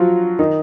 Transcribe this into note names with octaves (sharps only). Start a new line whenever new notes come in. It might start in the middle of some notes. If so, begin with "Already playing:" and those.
Already playing: F3 F#3 F4 F#4
D#3 D#4